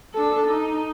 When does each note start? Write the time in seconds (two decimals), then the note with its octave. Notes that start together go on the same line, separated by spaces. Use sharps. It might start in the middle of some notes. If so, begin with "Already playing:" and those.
0.14 D4 A4
0.46 D#4